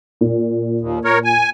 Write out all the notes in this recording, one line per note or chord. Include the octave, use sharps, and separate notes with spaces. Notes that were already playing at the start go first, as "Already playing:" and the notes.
A#2
D#2
A#4 C#5
G#5